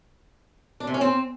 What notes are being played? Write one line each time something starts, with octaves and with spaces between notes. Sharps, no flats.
D4
C3
C#4
C4